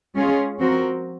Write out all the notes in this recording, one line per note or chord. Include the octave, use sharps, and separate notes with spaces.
G#3 C#4 F4 G#4
F3 C4 F#4 A#4